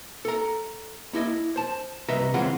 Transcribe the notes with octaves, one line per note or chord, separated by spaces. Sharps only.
A4 A#5
A#3 E4 D#5
C5 A5
C2 B4 D#5 E5 A#5
C#3 E3 G#3 C4 F4 F#5